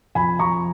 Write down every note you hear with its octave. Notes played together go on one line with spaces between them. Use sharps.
F2 G#5 B5
F2 A#5 C#6